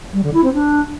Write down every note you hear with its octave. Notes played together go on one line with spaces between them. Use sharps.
G3
D3
E4
C4
D4